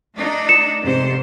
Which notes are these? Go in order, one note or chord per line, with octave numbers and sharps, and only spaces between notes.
A3 D4 D#4
C#7 E7
F1 G#2 C3 C5